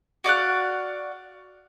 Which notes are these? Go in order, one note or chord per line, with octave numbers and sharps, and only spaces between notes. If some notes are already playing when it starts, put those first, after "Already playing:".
F#4 D5 F5 F#6